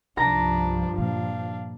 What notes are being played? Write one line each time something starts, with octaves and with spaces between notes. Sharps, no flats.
C2 G2 F3 D4 A#5 A#6
A#2 D3 D4 F5